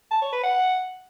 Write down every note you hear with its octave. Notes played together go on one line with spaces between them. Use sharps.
A5
C#5
B4
F#5